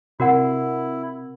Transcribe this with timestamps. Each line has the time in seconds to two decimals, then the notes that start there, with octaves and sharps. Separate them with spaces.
0.20 C3 E4 F#4 A#4 F#5